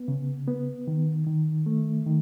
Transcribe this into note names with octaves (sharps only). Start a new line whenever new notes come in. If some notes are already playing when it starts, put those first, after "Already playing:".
Already playing: B3
C#3
B3
D#3
D#3
A3
D#3